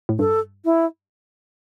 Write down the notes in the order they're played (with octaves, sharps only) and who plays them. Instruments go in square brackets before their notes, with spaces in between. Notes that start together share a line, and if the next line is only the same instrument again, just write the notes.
[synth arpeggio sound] A2
[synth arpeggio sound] G2 [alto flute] A4
[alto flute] E4